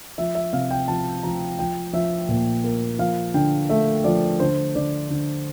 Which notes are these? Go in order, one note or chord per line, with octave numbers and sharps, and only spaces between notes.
F3 E5
E5
C3 F5
G5
F3 A5
F3 A#5
F3 G5
F3 E5
A#2
A#3
F3 F5
D3 G5
A3 E5
F3 D5
D3 C5
D3 D5
D3